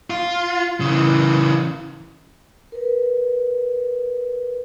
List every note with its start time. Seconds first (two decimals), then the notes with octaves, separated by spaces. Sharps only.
0.10 F4
0.81 C#3 E3
2.72 A#4 B4